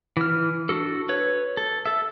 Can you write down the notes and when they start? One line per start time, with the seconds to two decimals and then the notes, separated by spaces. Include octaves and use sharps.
0.17 E3 F6
0.69 D4 F#4 A4
1.09 B4 C#5
1.57 A4
1.86 A4 E5